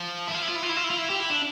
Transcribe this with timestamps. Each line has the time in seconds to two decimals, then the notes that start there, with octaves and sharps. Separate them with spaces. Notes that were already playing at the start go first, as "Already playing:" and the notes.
Already playing: F3
0.28 E4
0.34 F4
0.42 E4
0.49 F4
0.56 E4
0.63 F4
0.69 E4
0.77 F4
0.84 E4
0.90 F4
0.98 E4
1.10 G4
1.20 E4
1.30 D4